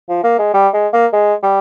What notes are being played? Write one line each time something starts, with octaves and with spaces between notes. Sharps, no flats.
F3
A#3
G#3
G3
G#3
A#3
G#3
G3